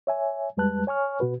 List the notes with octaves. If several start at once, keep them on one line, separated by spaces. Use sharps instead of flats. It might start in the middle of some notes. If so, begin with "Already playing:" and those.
C#5 E5 G#5
F2 G3 G#3 B4 A5 F#6
C#5 G#5 C#6 F6
B2 F#4 B4